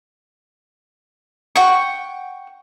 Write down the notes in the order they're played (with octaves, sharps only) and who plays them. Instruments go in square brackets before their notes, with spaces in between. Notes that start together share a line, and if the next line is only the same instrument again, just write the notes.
[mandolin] F#5 G5 C#6